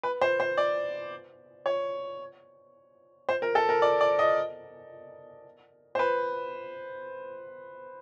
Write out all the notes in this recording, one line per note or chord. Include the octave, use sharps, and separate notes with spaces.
B4
C5
C5
D5
C#5
C5
A#4
A4
A#4
D5
D5
D#5
C5
B4